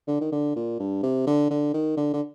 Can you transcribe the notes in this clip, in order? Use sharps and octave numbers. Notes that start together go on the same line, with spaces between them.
D3
D#3
D3
A#2
G2
C3
D3
D3
D#3
D3
D3